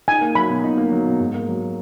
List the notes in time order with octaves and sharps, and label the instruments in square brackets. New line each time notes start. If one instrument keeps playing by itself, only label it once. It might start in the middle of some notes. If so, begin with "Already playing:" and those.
[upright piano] D#4 [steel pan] G#5
[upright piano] A#3
[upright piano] F#3 [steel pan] B5
[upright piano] B2
D#4
A#3
F#3
B2
G#2
A#3
F#3